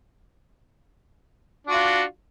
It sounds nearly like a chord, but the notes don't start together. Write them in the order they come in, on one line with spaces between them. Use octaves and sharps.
D4 F#4 F4